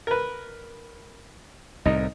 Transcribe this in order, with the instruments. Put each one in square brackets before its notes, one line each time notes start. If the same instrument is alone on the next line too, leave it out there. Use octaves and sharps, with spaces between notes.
[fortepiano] A#4 B4
[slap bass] C2 A2 [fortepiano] D#4